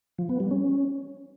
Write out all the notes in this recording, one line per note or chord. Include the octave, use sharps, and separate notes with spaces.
F3
B3
G3
C#4